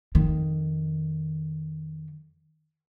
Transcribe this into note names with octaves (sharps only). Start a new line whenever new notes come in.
F2 D#3